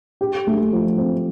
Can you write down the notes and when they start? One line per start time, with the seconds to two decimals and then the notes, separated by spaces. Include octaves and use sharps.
0.21 G4
0.47 A3
0.73 F3
0.98 C4